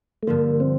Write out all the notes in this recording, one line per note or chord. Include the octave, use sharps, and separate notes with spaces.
A3
G2 D3 F3 A#3
C4